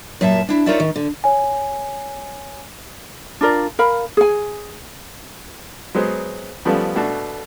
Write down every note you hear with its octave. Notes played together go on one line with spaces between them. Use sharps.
F#2 A#2 E5 A5
D4 E4
D#4 F4 A#4 C#5 D5 E5
D#3
D3
C#5 G#5
D4 F4 A#4 D5
A#4 F5 B5
G#4 G#5
F#3 G#3 B3 C5
C#3 F3 G3 A3 B3
B2 A3 D4 F#4